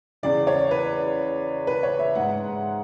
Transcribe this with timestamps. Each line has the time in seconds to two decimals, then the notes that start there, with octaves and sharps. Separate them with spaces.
0.23 E2 C#3 E3 D5
0.47 C#5
0.71 B4
1.67 B4
1.83 C#5
1.99 E5
2.15 G#2 G#3 F#5